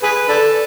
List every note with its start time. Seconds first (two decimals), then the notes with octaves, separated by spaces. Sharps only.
0.03 G#4 B4
0.29 D4 A4